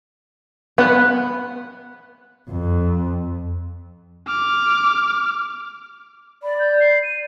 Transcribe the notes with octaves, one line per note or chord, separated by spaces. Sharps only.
B3 B4 F#5
F2
D6 F6
D5 B5
G6
C7
D#7